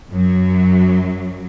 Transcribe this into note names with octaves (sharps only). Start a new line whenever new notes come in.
F#2 F#3